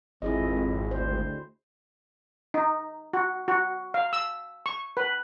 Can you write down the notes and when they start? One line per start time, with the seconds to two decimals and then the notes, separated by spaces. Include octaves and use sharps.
0.22 G#1 F2 E4 G#4 D#5
0.91 D2 C5
2.54 D#4
3.13 F#4
3.48 F#4
3.94 F5
4.13 E6
4.66 C#6
4.97 B4